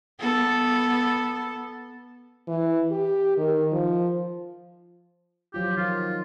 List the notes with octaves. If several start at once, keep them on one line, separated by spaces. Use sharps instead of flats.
B3 A4
E3
G4
D#3
F3
F3 F#3 F4 G4
D#3 F4